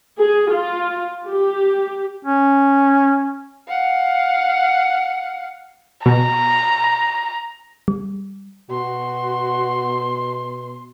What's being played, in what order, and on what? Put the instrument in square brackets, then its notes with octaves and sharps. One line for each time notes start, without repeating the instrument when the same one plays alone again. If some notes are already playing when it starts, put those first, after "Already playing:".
[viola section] G#4
F4
G4
[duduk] C#4
[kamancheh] F5 F#5
[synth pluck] B2 [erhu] A#5
[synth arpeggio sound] G3
[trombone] B2 [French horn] F#4 [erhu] C6